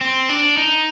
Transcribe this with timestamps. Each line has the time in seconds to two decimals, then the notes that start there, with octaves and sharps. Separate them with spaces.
0.01 C4
0.29 D4
0.57 D#4